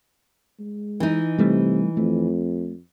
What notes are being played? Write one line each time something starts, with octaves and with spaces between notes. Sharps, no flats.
G#3
E3 D#4
C3 G3 A3
F2 A3